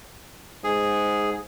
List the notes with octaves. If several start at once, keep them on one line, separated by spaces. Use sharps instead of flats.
G#2 G#4